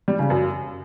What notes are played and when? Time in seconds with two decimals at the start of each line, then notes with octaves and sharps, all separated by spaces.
0.08 G3
0.19 C#3
0.30 F#2